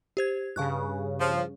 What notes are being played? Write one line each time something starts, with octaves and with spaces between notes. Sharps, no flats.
G4 C5 G#6
G2 C#3 F5 C#6 F#6
F3